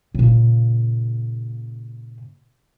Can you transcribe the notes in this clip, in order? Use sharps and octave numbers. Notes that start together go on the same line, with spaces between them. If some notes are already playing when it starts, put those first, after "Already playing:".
A#2 C#3